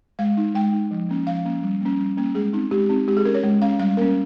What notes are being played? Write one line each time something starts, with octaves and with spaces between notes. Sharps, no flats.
G#3 F5
D#4
G#3 G5
D#4
F3
A#3 C#4
F3 F5
A#3 C#4
G3
A#3 C#4
G3
A#3 C#4
G#3 G#4
C4 D#4
G#3 G4
C4 D#4
G#3 G4
G#4
C#4 A#4
C#5
G#3
C#4 F5
G3 F5
A#3 C#4 A#4